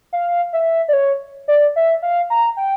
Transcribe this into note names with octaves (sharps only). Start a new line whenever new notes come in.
F5
E5
D5
C#5
D5
E5
F5
A#5
G5